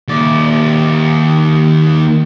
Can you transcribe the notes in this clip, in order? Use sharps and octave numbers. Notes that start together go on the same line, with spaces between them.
D#2 D5